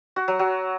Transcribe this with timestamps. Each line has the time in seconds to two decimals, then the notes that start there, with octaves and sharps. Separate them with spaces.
0.16 F#4
0.28 F#3
0.39 F#3